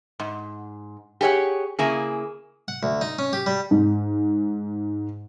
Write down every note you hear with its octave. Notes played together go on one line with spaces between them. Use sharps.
G#2
G4 G#4 C#5 D#5 F#5
C#3 A#3 E4 G#4
F#5
D2
D#4
C#4
G4
G3
G#2